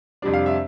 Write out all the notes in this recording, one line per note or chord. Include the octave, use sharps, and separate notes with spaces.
F2 C3 G3 D4
F5
E5